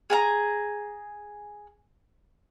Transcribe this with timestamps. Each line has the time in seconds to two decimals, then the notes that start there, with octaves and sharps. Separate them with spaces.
0.10 G#4 G#5 A#5